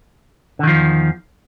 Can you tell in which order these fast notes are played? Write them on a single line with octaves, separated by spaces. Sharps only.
D3 D#3 F3 E2